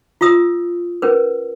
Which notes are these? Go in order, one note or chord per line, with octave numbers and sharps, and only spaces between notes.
F4 E5 D#6 E6
C#4 A#4 B4